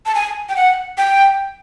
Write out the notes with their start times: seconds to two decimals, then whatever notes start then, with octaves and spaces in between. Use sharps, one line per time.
0.06 A5
0.15 G#5
0.49 G5
0.56 F#5
0.98 G5